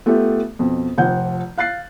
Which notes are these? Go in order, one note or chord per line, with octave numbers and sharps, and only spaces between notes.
A3 B3 F4 G4 A4
F2 B2
F1 F3 F#5 G6
F5 F#6 A6 C7